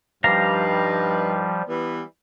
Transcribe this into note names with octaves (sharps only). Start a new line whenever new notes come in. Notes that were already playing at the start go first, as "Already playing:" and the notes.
G2 F3 G3 D#4 G4 B4 F5 A#5
E3 G3 B3